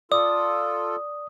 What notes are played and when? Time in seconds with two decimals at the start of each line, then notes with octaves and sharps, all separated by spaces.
0.12 F4 A4 D5 D#6